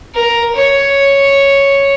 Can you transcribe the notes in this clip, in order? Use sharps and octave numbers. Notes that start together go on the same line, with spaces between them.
A#4
C#5